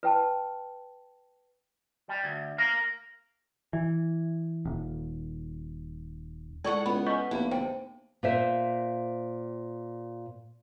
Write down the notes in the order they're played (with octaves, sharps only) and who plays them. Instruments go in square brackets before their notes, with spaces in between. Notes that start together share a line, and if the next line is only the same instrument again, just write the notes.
[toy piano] B4 G5 A5
[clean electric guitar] G3
D2
A#4 F5
[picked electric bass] E3
D#1
[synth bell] G#3 E4 [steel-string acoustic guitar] G#4 A4 F#5 [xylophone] D5 C#6
[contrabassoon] C#2 [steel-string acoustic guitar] B3 [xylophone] B5
[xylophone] D#5 C#6 G6 [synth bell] G#5 B6
[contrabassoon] F1 [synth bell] A#3 B3 F5 [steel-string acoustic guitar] E4
[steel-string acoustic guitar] D3 [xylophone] C5 G5
[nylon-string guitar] A#2 C5 E5